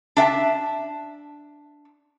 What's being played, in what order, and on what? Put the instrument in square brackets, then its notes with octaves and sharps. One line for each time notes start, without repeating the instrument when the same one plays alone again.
[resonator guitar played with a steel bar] D4 E5 G5 A5